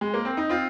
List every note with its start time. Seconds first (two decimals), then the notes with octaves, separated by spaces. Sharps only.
0.01 G#3
0.14 A#3
0.25 C4
0.37 D#4
0.49 C4 F4